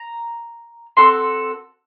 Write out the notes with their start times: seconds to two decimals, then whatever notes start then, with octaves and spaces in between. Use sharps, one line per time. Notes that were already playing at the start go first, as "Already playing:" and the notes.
Already playing: A#5
0.97 C4 F#4 A4 C6